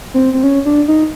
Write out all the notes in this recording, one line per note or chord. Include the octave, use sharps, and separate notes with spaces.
C4
C4
C#4
D4
D#4